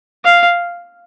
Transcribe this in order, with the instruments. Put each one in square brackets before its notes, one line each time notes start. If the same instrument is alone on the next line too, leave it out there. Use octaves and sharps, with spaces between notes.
[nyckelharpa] F5